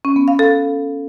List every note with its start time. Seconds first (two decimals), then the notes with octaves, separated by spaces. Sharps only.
0.05 C#4
0.16 B3
0.28 F5
0.39 A4